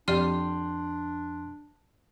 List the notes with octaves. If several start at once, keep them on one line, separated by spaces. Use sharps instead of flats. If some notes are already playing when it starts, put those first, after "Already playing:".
F2 D4 G4 D5 C6 F6 D#7